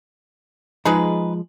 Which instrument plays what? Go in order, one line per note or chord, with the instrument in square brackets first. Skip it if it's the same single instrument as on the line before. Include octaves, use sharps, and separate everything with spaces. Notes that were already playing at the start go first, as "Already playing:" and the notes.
[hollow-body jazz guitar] F3 G#3 [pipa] D#4 G#4 B4